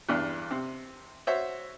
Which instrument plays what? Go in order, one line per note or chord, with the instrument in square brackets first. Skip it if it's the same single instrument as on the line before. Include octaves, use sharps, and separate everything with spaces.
[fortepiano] E2 G2
C3
F#4 C5 C#5 E5